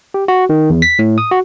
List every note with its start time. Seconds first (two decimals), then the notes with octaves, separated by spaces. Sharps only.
0.14 G4
0.28 F#4
0.49 D#3
0.70 E2
0.82 B6
0.99 A2
1.18 D#6
1.31 F#4